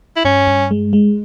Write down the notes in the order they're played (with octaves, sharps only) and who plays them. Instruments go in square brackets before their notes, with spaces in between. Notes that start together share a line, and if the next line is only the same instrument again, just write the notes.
[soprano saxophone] E4
[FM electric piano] G2 [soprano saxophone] C#4
[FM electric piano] G2
G#3
G#3